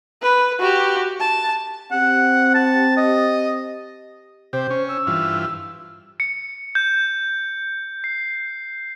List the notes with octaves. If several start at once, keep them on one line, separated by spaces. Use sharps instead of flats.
B4
F#4 G4
A5
C4 G4 F#5
A5
D#5
C3 G4 C5
C#4
E6
G2 E3 F4
C#7
G6
C7